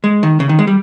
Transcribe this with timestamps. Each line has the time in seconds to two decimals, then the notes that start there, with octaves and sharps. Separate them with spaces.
0.04 G#3
0.23 D#3
0.40 C#3
0.49 D#3
0.59 G#3
0.67 G3